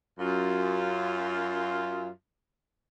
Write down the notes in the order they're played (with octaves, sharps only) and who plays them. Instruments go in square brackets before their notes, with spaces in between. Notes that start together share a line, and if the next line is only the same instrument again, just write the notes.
[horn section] F#2 F4